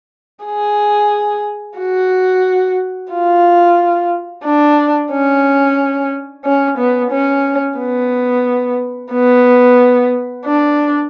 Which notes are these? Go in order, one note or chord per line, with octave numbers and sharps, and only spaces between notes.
G#4
F#4
F4
D4
C#4
C#4
B3
C#4
B3
B3
D4